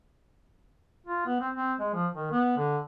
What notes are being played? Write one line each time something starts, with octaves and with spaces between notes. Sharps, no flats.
F4
B3
C4
C4
G#3
F3
D#3
B3
D3